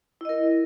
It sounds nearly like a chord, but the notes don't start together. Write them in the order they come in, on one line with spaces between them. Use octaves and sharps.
E4 D#5 A#4